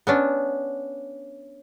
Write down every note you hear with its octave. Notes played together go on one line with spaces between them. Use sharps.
B3 C#4 D4